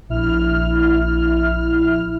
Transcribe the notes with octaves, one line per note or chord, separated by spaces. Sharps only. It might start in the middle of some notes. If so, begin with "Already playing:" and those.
A#1 E4 F6